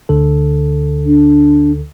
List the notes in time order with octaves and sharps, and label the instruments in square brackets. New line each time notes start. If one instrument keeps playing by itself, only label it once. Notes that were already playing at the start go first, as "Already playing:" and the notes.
[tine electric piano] D2 D3 A4
[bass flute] D4